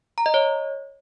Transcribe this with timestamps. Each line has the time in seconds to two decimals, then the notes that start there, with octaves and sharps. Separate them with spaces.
0.18 A#5
0.26 D#5
0.34 C#5